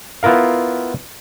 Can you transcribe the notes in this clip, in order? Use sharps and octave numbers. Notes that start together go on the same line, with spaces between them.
B3 E4 F4 A#4 F5